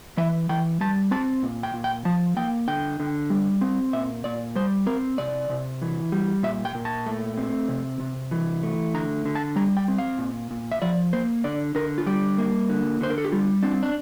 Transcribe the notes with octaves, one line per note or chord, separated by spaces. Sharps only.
E3 E5
E3 G5
G3 A5
C4 A5
A#2
G5
A#2
G5
F3 A5
A#3 G5
D3 G5
D3
G3
C4
A#2 E5
A#2 D5
G3 C5
C4 A#4
C3 D5
C3
E3
G3
A#2 E5
G5
A#2
A5
A3
C4
C3
C3
E3
A3
D3 A#5
D3
A5
G3 A#5
G5
C4
F5
A#2
A#2
E5
F3 D5
A#3 C5
D3 D5
D3 A#4
F4
G3 G4
A#3
D3
D3 C5
A#4
A4
G4
G3 F4
C4 D4
D4